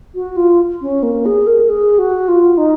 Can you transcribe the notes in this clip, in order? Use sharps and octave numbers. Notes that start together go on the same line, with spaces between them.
F#4
F4
C#4
A#3
G#4
A#4
G#4
F#4
F4
D#4